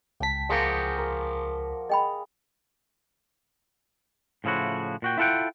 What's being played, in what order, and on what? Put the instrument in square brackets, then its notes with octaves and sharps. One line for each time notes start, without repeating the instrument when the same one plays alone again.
[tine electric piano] C#2 B6 [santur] G5 A5
[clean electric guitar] F3 F#4 G4 [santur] G#3 A#3 D#6
[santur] A#4
[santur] G#4 [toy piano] D#5 G5 B5
[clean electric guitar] A2 C#3 F3 E4 F#4
A#2 F#4 G5
E4 F4 A4 E5 F#5 G5